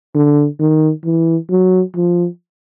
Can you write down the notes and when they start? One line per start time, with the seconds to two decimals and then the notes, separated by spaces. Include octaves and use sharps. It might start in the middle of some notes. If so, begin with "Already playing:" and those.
0.15 D3
0.60 D#3
1.05 E3
1.50 F#3
1.95 F3